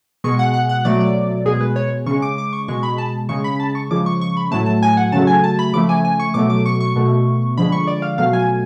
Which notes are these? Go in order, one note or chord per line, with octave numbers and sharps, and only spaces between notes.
B2 G#3 C#6
F#5
F#5
F#5
B2 F#3 A3 D5
D5
B2 G#3 G#4
B4
C#5
C#3 G#3 C#6
D6
D6
C#6
B2 G#3 C#6
B5
A5
C#3 G#3 C#6
B5
A5
C#6
C#3 F3 G#3 D6
C#6
C#6
B5
A2 F#3 A3 A5
A5
G#5
F#5
C#3 F#3 A3 A5
G#5
A5
B5
C#3 F3 A3 D6
G#5
G#5
C#6
B2 F#3 A3 D6
D6
C#6
C#6
B2 A3
D3 F3 G#3 B5
C#6
D5
F5
B2 F#3 A3 F5
G#5